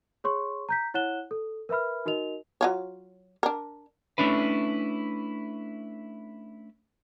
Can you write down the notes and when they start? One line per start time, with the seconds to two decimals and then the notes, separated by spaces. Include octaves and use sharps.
0.24 G#4 C#5 C6 C#6
0.69 A#5 G6 B6
0.94 E4 C#5 F#5 F#6 E7 G7
1.31 A4
1.69 A#4 B4 E5 B5 F6
2.06 D#4 F#4 A#4 D#5 F7
2.61 F#3 F4 C#5
3.43 D4 A#4
4.18 A3 A#3 C#4 D4 E4 B4